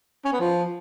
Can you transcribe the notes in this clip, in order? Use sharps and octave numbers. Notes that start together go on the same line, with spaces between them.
C#4
B3
F3